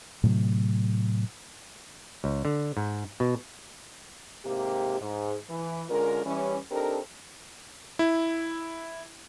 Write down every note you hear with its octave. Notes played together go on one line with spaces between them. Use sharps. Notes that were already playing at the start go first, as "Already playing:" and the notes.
A2 C3 F#3
C#2
D3
G#2
B2
G#2 C3 A#3 G4
G#2
E3
D3 G#3 C#4 F4 A#4
E3 G3 C#4
C4 D4 D#4 G4 A4 A#4
E4